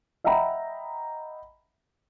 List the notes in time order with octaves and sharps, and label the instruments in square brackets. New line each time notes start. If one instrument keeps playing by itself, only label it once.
[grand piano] D#5 E5 F#5 G5 A#5 B5